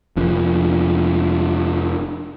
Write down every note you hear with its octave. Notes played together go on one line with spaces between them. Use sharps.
F1 F3 D4